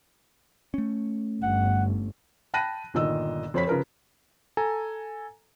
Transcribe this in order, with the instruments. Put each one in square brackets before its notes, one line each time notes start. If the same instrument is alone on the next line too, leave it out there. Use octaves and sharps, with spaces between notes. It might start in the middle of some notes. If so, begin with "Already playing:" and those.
[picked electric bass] A3 C#4
[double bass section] G1 [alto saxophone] F#5
[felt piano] G5 A5 B5 F#6 A#6 D#7
G1 A#2 D#3 D#5 E6
F2 C5 C#5 B5 B6
C#3 F3 A#4 B4
[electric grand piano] A4 G#5 A#5